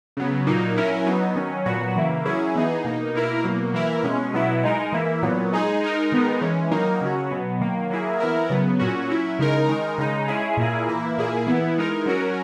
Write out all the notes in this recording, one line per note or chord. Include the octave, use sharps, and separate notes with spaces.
C#3 F#3 B3
A#2 F#3 A#3 D#4
F#3 C#4 E4 A#4
F#3 B3 D#4
D#3 F#3 C#4
A#2 F#3 B3 F#4
C#3 E3 A#3 E4
F#3 C#4 E4 G#4
E3 B3 D#4 G#4
B2 A#3 D#4
B2 A#3 E4 A#4
B2 F#3 A#3
E3 A#3 E4 A#4
B2 G#3 C#4
B2 F#3 B3 E4
G#3 D#4 A#4
E3 A#3 E4
A#2 F#3 B3
G#3 D#4 G#4
G#3 D#4 A#4
D#3 G#3 B3 D#4 A#4
E3 G#3 C#4
D#3 F#3 A#3 D#4 A#4
C#3 F#3 C#4 F#4
B2 F#3 B3
D#3 F#3 A#3
F#3 A#3 E4 G#4
E3 B3 E4 A#4
C#3 F#3 B3
A#2 F#3 C#4 F#4
F#3 C#4 E4
C#3 G#3 D#4 A#4
D#3 G#3 D#4 A#4
C#3 G#3 D#4
G#3 C#4 E4 G#4
A#2 A#3 E4 G#4
E3 A#3 E4
A#2 A#3 E4 G#4
E3 B3 E4
E3 G#3 D#4 A#4
F#3 C#4 F#4 A#4